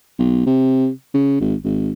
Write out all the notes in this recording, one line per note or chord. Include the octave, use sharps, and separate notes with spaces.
B1
C3
C#3
G#1
G#1